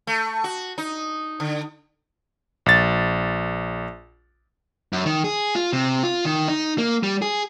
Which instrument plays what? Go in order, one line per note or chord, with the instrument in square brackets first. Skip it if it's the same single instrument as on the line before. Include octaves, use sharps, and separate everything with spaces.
[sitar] A3
F#4
D#4
D3
[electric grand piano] A#1 A6
[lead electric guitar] F#2
D#3
G#4
F4
C3
F4
D#3
D#4
A#3
G3
G#4